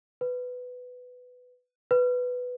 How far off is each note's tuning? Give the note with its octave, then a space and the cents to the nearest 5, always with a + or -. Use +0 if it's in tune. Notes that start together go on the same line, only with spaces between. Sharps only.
B4 +10
B4 +5